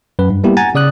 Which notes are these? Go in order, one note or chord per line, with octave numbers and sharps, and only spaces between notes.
F#2 B4
G2
G3 A#3 B3 E4 G4
F#5 G#5 A#5 A6
C#3 D5 D#6 F#6